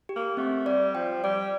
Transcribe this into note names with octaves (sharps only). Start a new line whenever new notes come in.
G4
A#3
A3 C4
G3 D5
F3 G5
G3 D5